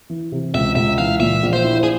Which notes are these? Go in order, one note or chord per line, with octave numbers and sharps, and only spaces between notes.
E3
C3
C#2 E5
C#2 E5
E3 F5
A#2 E5
A#1
C5
E4
G#4